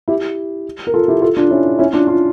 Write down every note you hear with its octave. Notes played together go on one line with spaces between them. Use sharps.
E4 G4
A#4
F4 A4
E4 G4
F4 A4
D4 F4
C#4 E4
C#4 E4
D4 F4
D4 F4